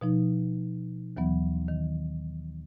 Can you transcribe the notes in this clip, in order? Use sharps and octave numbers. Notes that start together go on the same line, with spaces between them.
B2 F3 D#4
D#2 E3 F#3 B3
D#3